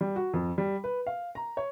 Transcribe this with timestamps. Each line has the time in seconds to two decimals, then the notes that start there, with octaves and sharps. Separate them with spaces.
0.01 G3
0.16 F#4
0.33 F2
0.58 G3
0.84 B4
1.07 F5
1.35 A#5
1.57 C#5